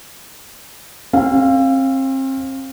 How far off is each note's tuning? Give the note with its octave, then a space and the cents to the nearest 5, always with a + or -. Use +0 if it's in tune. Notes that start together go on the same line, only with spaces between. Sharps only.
C4 +35 F5 +0